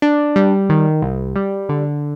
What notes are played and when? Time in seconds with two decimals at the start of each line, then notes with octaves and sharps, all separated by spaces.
0.02 D4
0.36 G3
0.69 D#3
1.02 C2
1.36 G3
1.69 D3